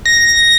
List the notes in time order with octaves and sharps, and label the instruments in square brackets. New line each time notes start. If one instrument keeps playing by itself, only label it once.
[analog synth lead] A#6